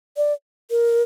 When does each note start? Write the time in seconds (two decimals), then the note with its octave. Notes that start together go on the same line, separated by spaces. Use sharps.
0.17 D5
0.71 A#4